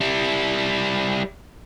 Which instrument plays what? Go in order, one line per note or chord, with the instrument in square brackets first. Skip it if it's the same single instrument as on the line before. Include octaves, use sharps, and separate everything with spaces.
[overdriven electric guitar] G3 E4